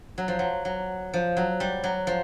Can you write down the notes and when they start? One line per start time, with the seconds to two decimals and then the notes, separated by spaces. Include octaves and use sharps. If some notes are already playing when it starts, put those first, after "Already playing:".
0.18 F#3
0.28 F3
0.39 F#3
0.65 F#3
1.14 F3
1.37 F#3
1.60 G3
1.84 F#3
2.07 F3